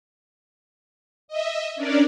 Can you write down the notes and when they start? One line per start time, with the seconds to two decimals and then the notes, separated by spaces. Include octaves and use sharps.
1.28 D#5 E5
1.76 C#4 D4 A#4 D5